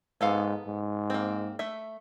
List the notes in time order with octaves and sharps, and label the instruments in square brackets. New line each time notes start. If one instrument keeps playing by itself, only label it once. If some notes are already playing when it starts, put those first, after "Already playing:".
[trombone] G#2 [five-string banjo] B3 A4 F5
[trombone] G#2
[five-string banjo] A#3 C4
A3 E5